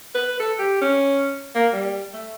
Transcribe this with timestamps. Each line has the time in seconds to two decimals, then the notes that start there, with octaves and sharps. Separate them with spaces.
0.15 B4
0.40 A4
0.59 G4
0.82 C#4
1.55 A#3
1.73 G3
2.14 A3